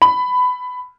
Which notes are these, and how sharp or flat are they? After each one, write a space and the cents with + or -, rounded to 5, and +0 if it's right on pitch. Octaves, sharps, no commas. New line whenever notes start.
B5 +15